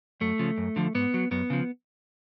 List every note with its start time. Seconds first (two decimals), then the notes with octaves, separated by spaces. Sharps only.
0.21 F#2 A3
0.39 C#3 F3
0.58 F#2
0.76 D3 F3
0.95 G#2 B3
1.14 F#3
1.31 F#2 B3
1.50 C#3 F3